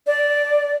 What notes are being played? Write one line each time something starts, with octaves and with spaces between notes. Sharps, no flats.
D5